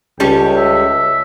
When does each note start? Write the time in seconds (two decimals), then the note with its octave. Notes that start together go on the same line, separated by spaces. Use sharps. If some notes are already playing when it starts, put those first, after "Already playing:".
0.20 C#2 G3 C#4 A4 G5
0.57 E5